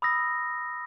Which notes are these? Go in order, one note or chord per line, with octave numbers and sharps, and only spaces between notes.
B5 D#6 E6 A#6